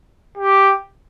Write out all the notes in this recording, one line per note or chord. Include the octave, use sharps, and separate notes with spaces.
G4